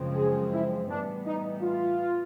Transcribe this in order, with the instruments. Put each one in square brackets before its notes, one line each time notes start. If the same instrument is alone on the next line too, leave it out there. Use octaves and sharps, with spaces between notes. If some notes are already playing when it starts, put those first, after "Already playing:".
Already playing: [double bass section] F#2 C#3 F3 G#3 C4
[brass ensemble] G#4
E4
[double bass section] A2 E3 G3 B3 [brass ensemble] D4
[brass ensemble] D#4
F4